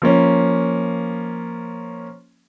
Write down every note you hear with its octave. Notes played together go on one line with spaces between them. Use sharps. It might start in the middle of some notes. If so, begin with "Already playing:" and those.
F3 A#3 C#4